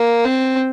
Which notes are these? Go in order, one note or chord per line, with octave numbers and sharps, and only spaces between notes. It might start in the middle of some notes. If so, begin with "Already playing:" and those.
Already playing: A#3
C4